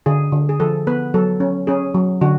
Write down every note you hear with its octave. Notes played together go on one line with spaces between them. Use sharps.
D3 G#4
D3
G#4
F3 A4
B3 B4
F#3 A4
C#4
C#4 G#4
F#3
D3 F#4